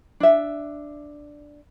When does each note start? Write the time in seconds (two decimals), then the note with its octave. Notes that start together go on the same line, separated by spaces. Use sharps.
0.20 D4 E5